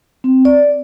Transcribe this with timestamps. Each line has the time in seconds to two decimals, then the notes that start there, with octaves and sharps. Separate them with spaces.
0.24 C4
0.45 D5